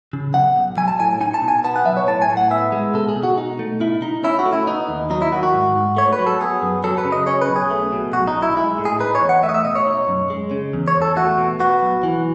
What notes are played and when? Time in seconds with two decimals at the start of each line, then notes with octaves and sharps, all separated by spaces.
0.13 C#3
0.34 B1 F#5
0.56 B1
0.77 F#3 G#5
0.88 A5
1.00 A2 G#5
1.21 D#4 G#5
1.34 A5
1.42 B2
1.48 G#5
1.64 B3 A5
1.76 F#5
1.86 F#3 E5
1.97 C#5
2.07 A2 A5
2.22 G#5
2.29 A2
2.37 F#5
2.50 B3 E5
2.72 G#3
2.94 B2 A4
3.09 G#4
3.16 B2
3.23 F#4
3.38 D#4
3.59 A3
3.80 B2 E4
4.02 B2 D#4
4.24 C#4 E4
4.39 F#4
4.46 A3
4.53 E4
4.67 B3 D#4
4.89 D#2
5.10 F#3 D#4
5.22 E4
5.32 D#3 F#4
5.43 F#4
5.53 G#2
5.75 G#2
5.97 A3 C#5
6.13 B4
6.19 F#3
6.26 A4
6.40 B3 G#4
6.62 F#2
6.84 F#3 A4
6.98 B4
7.05 C#3
7.12 D#5
7.27 C#4 C#5
7.42 B4
7.49 B1
7.56 G#4
7.70 A3
7.92 B2
8.13 B1 F#4
8.28 D#4
8.36 B1
8.42 E4
8.57 G#3 E4
8.78 A2
8.85 G#4
9.00 D#4 B4
9.15 C#5
9.22 E2
9.29 F#5
9.43 A3 E5
9.49 D#5
9.54 E5
9.65 B2 D#5
9.75 C#5
9.86 D#4
10.08 F#2
10.30 G#3
10.51 C#3
10.73 E2
10.88 C#5
10.95 E2
11.02 A4
11.16 A3 F#4
11.38 B2
11.60 B3 F#4
11.82 B1
12.03 E3